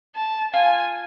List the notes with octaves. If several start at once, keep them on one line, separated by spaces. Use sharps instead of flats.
A5
F4 G#5